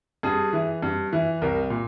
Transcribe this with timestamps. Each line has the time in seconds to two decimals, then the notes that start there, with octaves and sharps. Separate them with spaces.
0.23 G2 G#4
0.53 E3
0.83 G2
1.13 E3
1.42 C2 A#4
1.70 A#2